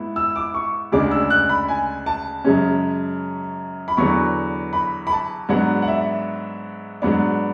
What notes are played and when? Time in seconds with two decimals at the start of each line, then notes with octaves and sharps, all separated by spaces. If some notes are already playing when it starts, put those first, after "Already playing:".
Already playing: G#2 B3 E4
0.16 E6
0.36 D6
0.54 C#6
0.92 D2 C#3 G#3 D4 D6
1.11 E6
1.30 F#6
1.49 B5
1.68 G#5
2.06 A5
2.44 F#2 C#3 G#3 C#4
3.88 B5
3.97 E2 D3 F#3 B3 C#6
4.73 B5
5.07 B5
5.12 A5
5.49 G#2 F#3 B3 D4 F#5
5.82 F#5
5.88 E5
7.02 G#2 F#3 B3 D4